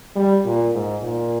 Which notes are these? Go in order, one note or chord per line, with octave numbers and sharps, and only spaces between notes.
G3
A#2
G#2
A#2